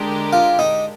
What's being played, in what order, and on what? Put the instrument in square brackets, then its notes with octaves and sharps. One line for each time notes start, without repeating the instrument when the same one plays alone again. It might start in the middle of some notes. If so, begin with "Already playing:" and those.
Already playing: [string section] D3 G#3 D4 G4 A#4
[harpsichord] F4
D#4